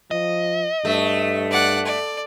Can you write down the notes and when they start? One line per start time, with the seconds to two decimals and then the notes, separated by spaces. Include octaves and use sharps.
0.11 F3 D#5
0.85 G2 A3
1.51 D5 F#5
1.85 D5